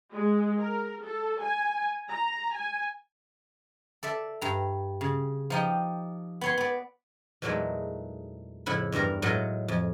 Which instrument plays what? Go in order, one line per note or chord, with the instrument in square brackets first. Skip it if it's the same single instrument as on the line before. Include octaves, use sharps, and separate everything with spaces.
[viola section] G#3
A#4
A4
G#5
A#5
G#5
[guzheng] A4 D5 E5
G2 A#5
C#3
F3 D#4 G4
B3 C#5 C6
B3 D5
E2 A#2 F#3 G#3 A3 D#4
F2 A2 C#3 E4 F#5 B5
E2 G2 G3 A#4 A#5
A2 F#3 G#3 F4 D#5 F#5
F2